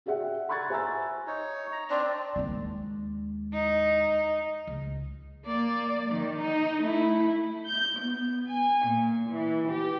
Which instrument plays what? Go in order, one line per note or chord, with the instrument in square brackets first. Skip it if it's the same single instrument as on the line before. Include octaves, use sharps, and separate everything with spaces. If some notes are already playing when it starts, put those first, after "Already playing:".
[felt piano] F#4 G#4 D5 E5 F#5 G5
A#5 B5 C#6 F#6 G#6 A6
C5 E5 G#5 A#5 E6 A6
[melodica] D#4 C#5
A#5
[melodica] C4 D4 [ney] D5
[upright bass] D#2 G#3
[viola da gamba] D#4
[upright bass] C#2
[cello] A#3 D5
D#3
D#4
A3 E4
[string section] G6
B3
G#5
A#2
E3
G4